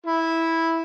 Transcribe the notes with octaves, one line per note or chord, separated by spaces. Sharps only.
E4